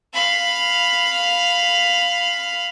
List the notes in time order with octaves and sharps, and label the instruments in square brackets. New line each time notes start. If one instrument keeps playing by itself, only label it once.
[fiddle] F5 B5